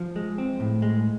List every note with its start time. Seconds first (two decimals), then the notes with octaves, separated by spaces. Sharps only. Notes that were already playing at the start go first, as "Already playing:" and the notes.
Already playing: F3
0.16 G#3
0.38 C4
0.60 A2
0.82 G#3